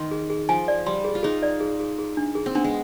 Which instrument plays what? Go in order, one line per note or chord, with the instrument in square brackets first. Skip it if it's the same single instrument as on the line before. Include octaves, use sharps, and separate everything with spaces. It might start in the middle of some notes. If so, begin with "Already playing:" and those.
Already playing: [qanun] D#3 [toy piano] C6
[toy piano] G#4
G#4
[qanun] F3 [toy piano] G#5
[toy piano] D5
[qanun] G3 [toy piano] C6
[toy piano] G#4
[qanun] F4
[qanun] D#4 [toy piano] G#4
[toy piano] D5
G#4
G#4
G#4
D4
G#4
[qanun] C4
[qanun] B3 [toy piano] D4
[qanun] G#3